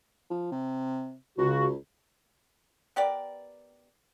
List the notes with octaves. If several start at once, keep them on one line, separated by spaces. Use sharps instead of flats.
F3
C3
C#2 C#3 F#4
B3 G4 A#4 D5